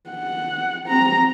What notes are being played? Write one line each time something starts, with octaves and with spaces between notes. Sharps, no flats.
F#5
C4 A#5